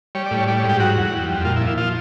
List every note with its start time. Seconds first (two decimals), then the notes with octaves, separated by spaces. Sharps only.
0.15 G3 C#5
0.26 D5
0.31 A2
0.37 C#5
0.47 G3 D5
0.58 C#5
0.64 G#2
0.69 G4
0.80 F#3 F#4
0.96 E2
1.13 G3
1.29 F2
1.45 A#2 F4
1.56 E4
1.61 F3
1.66 E4
1.77 F3 F4